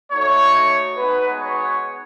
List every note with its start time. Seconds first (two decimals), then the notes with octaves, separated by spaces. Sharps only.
0.12 A3 D#4 F#4 C#5
0.97 G#3 B3 D#4 F#4 B4
1.40 C#5